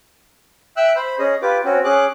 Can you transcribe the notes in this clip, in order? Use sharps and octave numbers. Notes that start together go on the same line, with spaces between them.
E5 G5 E6 F#6
C5 B5
C#4 G#4 D#5
F4 G4 B4 D6
C4 C#4 F#4
C#4 G#4 D6 F#6